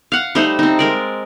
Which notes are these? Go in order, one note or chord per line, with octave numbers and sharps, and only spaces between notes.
F5 F#5
G3 A3 D#4 C5
C4 D#4
G#3 A#4 D5